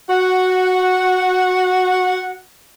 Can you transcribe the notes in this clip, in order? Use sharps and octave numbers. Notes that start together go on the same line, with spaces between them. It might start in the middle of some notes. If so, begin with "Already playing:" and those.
F#4 F#5